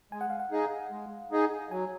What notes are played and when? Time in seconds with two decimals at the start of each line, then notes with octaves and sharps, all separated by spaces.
0.12 G#3 G#5
0.21 F#5
0.30 F5
0.40 F#5
0.51 D#4 G#4 D#5
0.91 G#3
1.31 D#4 G#4 D#5
1.71 F#3 G#5